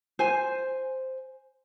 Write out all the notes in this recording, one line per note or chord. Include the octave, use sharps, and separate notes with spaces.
C5 G#5